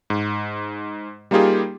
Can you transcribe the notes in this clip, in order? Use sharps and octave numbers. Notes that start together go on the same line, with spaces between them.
G#2
G3 A#3 D#4 F4 G4 G#4